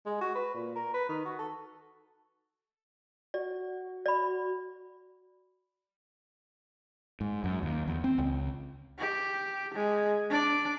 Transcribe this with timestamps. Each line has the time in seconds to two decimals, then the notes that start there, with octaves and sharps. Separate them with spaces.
0.06 G#3
0.21 F#4
0.35 B4
0.54 A#2
0.75 A#4
0.94 B4
1.09 D#3
1.25 F#4
1.39 A4
3.34 F#4 D5
4.06 D5 B5
7.21 G#2
7.44 F#2
7.63 D#2
7.87 E2
8.04 C4
8.18 C#2
8.99 G4
9.74 G#3
10.30 D4 D5